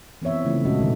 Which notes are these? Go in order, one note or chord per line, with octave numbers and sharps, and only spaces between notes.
E3 B3 C4 C#5 E5
C#3 F3 A3 E4
A#2 G#3 C#4 F#4 A4 D#5
B2 D3 D#3 G#3 D#4 F#4